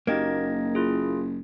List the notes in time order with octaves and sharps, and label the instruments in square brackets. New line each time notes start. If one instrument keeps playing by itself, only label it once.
[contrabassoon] F#1 [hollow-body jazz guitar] A#3 F#4 G4 [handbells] D#4 D#5 G#6
[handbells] E4 F4 G#4